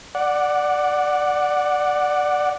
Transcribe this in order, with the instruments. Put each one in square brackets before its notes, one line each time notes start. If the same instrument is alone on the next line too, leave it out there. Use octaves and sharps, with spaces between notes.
[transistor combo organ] D5 F#5